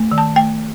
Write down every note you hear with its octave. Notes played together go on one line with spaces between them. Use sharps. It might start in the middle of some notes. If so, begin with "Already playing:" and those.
Already playing: A3
D#3
A5
A3 G5